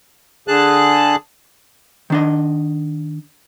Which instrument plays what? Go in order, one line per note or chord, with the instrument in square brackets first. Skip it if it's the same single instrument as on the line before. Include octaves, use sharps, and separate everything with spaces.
[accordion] D3 G#4 A5 F#6
[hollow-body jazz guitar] D#3 D4 D#5